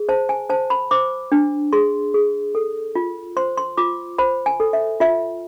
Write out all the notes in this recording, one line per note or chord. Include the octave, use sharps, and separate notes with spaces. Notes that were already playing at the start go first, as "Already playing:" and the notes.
Already playing: G#4
C5 A5
G#5
C5 A5
B5
C5 D6
D4
G#4 C6
G#4
A4
F4
C5 C6
C6
F4 D6
C5 B5
G#5
A4
E5
F4 E5